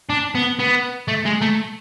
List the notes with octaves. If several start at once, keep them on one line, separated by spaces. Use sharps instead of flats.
D4
B3
B3
A3
G#3
A3